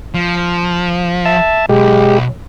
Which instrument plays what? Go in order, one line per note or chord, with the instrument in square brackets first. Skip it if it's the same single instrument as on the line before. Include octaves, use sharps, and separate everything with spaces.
[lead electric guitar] F3
[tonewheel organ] E5 A5
[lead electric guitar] B1 [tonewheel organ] G#3 G4